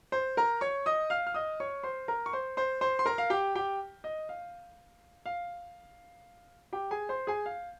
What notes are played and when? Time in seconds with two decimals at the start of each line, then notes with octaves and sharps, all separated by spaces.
0.12 C5 C6
0.37 A#4 A#5
0.61 C#5 C#6
0.86 D#5 D#6
1.10 F5 F6
1.27 F6
1.34 D#5 D#6
1.60 C#5 C#6
1.83 C5 C6
2.08 A#4 A#5
2.26 C#6
2.33 C5 C6
2.57 C5 C6
2.81 C5 C6
2.99 C6
3.06 A#4 A#5
3.18 F5
3.30 G4 G5
3.55 G4 G5
4.04 D#5
4.29 F5
5.26 F5
6.73 G4 G5
6.91 G#4 G#5
7.09 C5 C6
7.27 G#4 G#5
7.46 F5